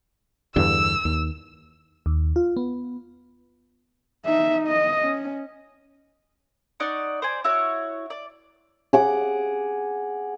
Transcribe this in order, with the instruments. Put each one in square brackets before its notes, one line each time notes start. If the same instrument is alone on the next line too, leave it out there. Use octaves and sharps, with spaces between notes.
[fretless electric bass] E2 G2 D3 [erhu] E6
[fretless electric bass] D#2
[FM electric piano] D#2
F4
B3
[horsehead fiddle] D#4 E5
D#5
C#4
[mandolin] D#4 D5 F#5 C#6
C5 D5 G#5
E4 F#4 C#5
D5
[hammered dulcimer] G#4 F#5 D6